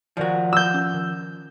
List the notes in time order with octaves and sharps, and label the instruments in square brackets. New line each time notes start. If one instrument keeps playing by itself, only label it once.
[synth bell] D#3 D5 G#5 [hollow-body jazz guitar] F3 F#4
[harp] E6 G6
[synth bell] C#4
D#3